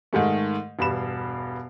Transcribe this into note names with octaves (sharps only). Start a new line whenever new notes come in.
G#2 D#3 G#3 A3
E1 G2 B5 E7